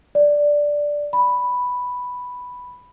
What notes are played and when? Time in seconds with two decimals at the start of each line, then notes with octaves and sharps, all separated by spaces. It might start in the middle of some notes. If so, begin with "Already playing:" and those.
0.15 D5
1.13 B5